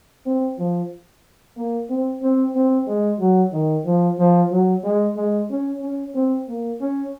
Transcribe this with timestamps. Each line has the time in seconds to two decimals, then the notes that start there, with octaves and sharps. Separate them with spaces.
0.26 C4
0.58 F3
1.57 A#3
1.89 C4
2.22 C4
2.55 C4
2.87 G#3
3.20 F#3
3.53 D#3
3.86 F3
4.19 F3
4.51 F#3
4.83 G#3
5.16 G#3
5.50 C#4
5.82 C#4
6.14 C4
6.48 A#3
6.81 C#4